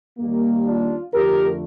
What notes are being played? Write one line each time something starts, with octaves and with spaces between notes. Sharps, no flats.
D#2 D#3 G3 A#3
D4 F4
F2 D3 A3 G4 A#4